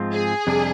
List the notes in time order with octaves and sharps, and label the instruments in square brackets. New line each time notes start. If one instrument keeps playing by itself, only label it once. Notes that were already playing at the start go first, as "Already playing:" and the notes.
Already playing: [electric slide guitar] G#2 F3 G#3 C4 F4
[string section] G#4
[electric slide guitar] F2 C3 G3 D4